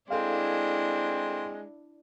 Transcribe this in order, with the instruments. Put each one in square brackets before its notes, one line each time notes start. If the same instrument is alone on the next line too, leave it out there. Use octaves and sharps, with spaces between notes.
[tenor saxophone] G#3 [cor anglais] C4 [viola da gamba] D4 E4 [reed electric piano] A4 F5